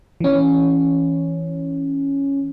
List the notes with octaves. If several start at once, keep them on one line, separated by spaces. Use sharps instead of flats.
E3 C#4